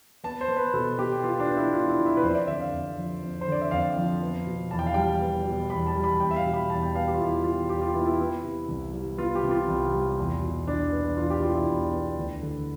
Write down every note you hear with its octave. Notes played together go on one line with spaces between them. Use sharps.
B3 A5
C5
B3
B4
B2 A4
B2 G4
B3 F4
D4
B3
E4
B2 F4
E4
B2
E4
B4
F2 C5
E5
D5
D3 E5
F5
F2
F3
F2
C5
D3 D5
E5
F2 F5
F3
B3
B2
E2 A5
G5
F5
G3 G5
B3
B2
E2 B5
A5
G3
B5
E2 G5
E5
F5
B2
B5
E2 A5
G5
B3 F5
G4
F4
E2 E4
B2 F4
E2 G4
F4
B3 E4
F4
E4
B3 E4
C3
C2
G3
B3 F4
G4
C3
F4
C2
G3
E2
B2
E2 D4
B3
E2 F4
G4
B2 F4
E4
E2
B3
D2
D3